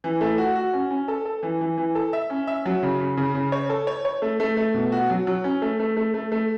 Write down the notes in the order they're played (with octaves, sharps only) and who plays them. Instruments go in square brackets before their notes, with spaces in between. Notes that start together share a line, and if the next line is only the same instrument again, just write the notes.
[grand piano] E3
A3
F#4
F#4
C#4
C#4
A4
A4
E3
E3
E3
A4
E5
C#4
E5
F#3
C#3
C#3
C#3
C#3
C#5
A4
C#5
C#5
A3
A3
A3
B2
F#4
F#3
F#3
C#4
A3
A3
A3
A3
A3